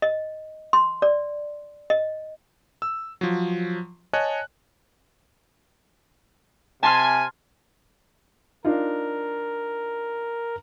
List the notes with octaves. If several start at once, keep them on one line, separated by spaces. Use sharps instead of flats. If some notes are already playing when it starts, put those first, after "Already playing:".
D#5
C6
D5
D#5
E6
F3 F#3
C#5 D#5 G#5 A5 F#6
C3 G#5 A5 C6 F6
D4 D#4 F4 A#4